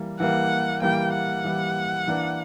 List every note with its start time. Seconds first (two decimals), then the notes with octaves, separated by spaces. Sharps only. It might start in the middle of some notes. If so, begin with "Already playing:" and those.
Already playing: E3 G3 A#3
0.20 E3 G3 A#3 F#5
0.82 E3 G3 A#3 G5
1.14 F#5
1.44 E3 G3 A#3
2.07 E3 A#3 D4 A#4